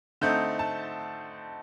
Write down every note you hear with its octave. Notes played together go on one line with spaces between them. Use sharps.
D3 A3 C4 D#4 G6
A5